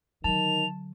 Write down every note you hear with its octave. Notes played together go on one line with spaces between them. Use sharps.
D3 D#3 F#3 A5 F7